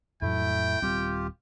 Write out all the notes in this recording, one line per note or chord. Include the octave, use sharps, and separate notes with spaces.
F2 A2 F#3 A3 E4 G5
D#1 G3 C4 F4 G4